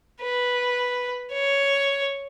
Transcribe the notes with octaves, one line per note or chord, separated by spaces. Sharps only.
B4
C#5